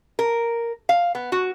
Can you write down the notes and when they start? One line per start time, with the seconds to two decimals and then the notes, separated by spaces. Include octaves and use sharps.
0.19 A#4
0.89 F5
1.15 B3
1.32 F#4